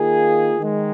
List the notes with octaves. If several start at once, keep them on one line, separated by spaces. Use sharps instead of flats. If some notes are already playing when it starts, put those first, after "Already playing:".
Already playing: D#3 A#3 F4 G#4
D#3 G#3